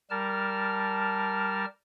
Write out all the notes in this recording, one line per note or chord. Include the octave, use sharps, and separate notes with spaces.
G3 A#4 A5 F6